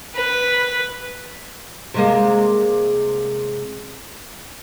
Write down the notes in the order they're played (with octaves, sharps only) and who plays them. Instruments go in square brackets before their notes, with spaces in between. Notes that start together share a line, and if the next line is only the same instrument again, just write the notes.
[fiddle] B4
[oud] C3 G#3 A#3